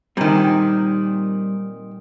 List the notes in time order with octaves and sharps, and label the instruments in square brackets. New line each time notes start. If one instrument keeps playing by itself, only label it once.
[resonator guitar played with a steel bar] A#2 D#3 [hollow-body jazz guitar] G3 C4